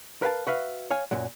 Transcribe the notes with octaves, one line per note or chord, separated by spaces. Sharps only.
A#4 B4 F5 G5 A5
F#4 B4 E5 F5
C#5 F5 G#5
F#2 A#2 F#3